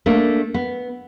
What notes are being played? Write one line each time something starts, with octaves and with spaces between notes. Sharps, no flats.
A3 A#3 D4
B3